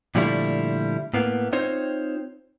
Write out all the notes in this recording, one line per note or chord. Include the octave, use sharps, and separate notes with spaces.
A#2 D3 F3 G3 A3 E4
A2 A#3 B3
C4 D#4 F4 C5 C#5